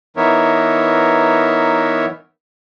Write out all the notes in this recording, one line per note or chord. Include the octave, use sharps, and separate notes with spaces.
E3 B3 D#4 A#4 C#5 E5